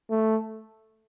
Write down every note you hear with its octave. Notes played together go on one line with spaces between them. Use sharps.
A3